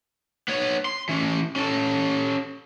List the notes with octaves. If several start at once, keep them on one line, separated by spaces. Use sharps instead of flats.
B3 C#5
C6
E3 C#4
C#4 A4